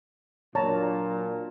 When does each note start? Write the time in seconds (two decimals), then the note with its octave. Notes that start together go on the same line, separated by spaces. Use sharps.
0.55 A#2 F#3 D4 C#5 A5 A#5